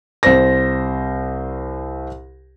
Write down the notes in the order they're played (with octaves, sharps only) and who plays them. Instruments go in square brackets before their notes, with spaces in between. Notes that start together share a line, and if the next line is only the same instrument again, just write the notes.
[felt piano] C2 C5 A#6